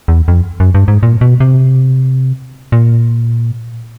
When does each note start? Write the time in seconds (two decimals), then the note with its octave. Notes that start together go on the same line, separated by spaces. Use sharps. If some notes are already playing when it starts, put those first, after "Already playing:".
0.08 E2
0.28 F2
0.60 F#2
0.74 G2
0.88 G#2
1.03 A#2
1.21 B2
1.40 C3
2.72 A#2